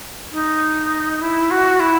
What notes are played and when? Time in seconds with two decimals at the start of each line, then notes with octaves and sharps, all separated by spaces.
0.32 D#4
1.21 E4
1.51 F#4
1.80 E4